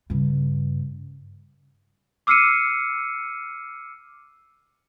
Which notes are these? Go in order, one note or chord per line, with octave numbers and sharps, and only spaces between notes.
G2 C#3
D6 E6 F6 C7 C#7 D#7